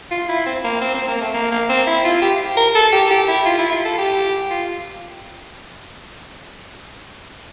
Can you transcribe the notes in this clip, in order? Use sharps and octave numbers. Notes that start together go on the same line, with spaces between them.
F4
E4
C4
A#3
C4
C4
A#3
A3
A#3
A#3
C4
E4
F4
G4
A#4
A4
G4
G4
E4
F4
E4
F4
A4
G4
F4